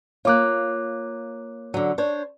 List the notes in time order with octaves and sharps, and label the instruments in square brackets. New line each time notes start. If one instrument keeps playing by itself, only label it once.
[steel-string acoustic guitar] A#3 F4 [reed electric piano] C#5 D6 F#6
[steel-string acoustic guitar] D3 F#3
D4 C5 C#5